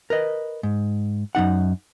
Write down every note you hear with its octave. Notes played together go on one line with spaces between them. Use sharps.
A#4 B4 D#5
G#2
F#2 F3 D#4 F#5